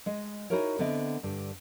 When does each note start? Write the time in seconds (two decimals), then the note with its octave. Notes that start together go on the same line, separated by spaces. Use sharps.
0.06 G#3 D#5
0.50 D#4 E4 F#4 G#4 A#4 C#5
0.79 D3 B3 C4 D#5 E5
1.23 G2 D3